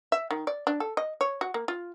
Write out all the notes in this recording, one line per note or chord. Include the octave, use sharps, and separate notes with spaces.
E5
D#3
D5
D4
A4
D#5
C#5
F#4
A#3
F4